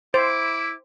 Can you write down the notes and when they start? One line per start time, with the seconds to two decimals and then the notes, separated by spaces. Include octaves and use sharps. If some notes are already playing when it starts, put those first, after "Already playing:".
0.14 E4 C5 D6